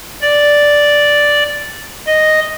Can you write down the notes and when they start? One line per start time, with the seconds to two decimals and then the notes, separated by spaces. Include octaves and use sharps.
0.22 D5
2.07 D#5